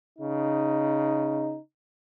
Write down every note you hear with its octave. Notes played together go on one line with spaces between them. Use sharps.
C#3 D#4